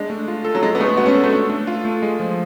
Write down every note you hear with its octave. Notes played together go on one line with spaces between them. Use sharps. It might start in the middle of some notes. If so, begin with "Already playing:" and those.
Already playing: G#3 D4
A3
F4
A4
F#3
G#3 D4
B3
G#3 A3
B3 F#4
C#4
A4
A3
D4
A3
F4
A3
G#3
F3